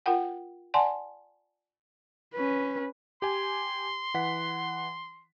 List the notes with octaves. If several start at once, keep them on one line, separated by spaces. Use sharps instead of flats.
F4 A#4 F#5 G5
D5 F#5 G#5 A5 C6
C#4 B4
G4 G#5 C6
E3 F#5 B6